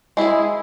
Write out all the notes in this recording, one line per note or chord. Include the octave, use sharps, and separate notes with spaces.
G#3 E4 G#4